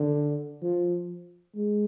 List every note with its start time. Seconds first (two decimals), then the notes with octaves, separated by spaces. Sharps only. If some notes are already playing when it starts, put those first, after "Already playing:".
Already playing: D3
0.63 F3
1.55 G#3